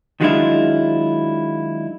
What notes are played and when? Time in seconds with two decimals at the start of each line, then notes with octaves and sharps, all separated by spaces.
0.21 D#3 F#3 G#3 D4 E4 F4